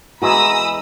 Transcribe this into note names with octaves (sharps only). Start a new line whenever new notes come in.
E2 E3 G#3 F#4 A#5 B5 D#6 E6